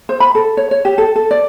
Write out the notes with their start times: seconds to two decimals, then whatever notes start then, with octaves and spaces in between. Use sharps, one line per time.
0.09 C5
0.20 B5
0.35 A4
0.57 C#5
0.71 C#5
0.85 G4
0.98 A4
1.16 A4
1.31 D5